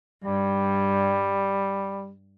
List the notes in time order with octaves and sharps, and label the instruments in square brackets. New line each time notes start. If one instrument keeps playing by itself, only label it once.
[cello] G2 [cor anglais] G3